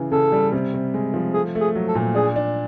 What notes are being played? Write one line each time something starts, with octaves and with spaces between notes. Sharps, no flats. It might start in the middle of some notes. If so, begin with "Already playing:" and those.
Already playing: C#3 E3
C#3 A4
G3
C3
C3
G#3
F3
A3 G#4
A3
G#4
F#3
A4
A#2
D4 G#4
D4